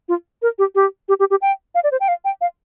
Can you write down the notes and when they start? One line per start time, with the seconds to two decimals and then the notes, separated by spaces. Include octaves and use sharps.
0.09 F4
0.42 A#4
0.59 G4
0.75 G4
1.09 G4
1.20 G4
1.30 G4
1.42 G5
1.75 F5
1.84 D5
1.92 C5
2.00 G5
2.08 F5
2.25 G5
2.41 F5